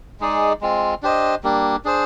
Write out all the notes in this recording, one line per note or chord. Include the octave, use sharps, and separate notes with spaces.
G#3 D#4 G#4 D5
G#3 C4 F4
D4 G4 C5 D#5
G3 A#3 D4
D4 G#4 C5